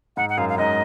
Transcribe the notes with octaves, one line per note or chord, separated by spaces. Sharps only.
G#2 F#5
F#5
F#2 F5
F5
G#2 D#5